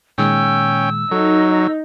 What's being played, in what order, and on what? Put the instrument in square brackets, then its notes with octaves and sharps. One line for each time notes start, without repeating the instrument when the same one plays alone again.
[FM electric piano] A#2 D#3 G#3 [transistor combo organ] C#4 G5 [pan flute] E6
[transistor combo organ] F#3 [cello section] D#4 [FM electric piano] A4